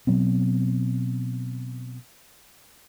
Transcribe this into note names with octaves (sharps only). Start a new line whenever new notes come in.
B2 F#3 B3 C4